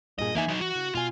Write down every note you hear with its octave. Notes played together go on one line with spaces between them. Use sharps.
G2 A#2 G#4 D#5
E3 A#3 D#4 E5 G#5
F#3 D#4
E3 F#4
C#3
B2 F4 G#5